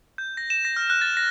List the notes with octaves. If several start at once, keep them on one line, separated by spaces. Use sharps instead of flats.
G6
A#6
E7
A#6
F6
F#6
A6
A#6